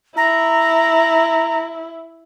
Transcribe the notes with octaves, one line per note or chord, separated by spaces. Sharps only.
E4 A#5